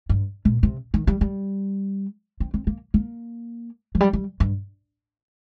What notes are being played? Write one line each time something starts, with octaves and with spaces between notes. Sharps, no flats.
G2
A#2
C3
D#3
G3
G3
C4
C4
A#3
A#3
F3
G3
G3
G2